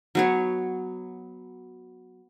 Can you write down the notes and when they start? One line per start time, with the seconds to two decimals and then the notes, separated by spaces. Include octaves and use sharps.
0.15 F#3 B3 C#5